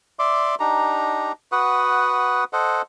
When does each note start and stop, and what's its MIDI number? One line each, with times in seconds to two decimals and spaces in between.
0.19 0.55 74
0.19 0.55 76
0.19 0.55 84
0.19 0.55 86
0.60 1.32 62
0.60 1.32 63
0.60 1.32 67
0.60 1.32 82
1.52 2.44 66
1.52 2.44 71
1.52 2.44 78
1.52 2.44 87
2.53 2.82 69
2.53 2.82 72
2.53 2.82 75
2.53 2.82 78